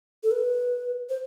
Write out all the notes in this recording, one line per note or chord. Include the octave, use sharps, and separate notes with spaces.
A4
B4
C5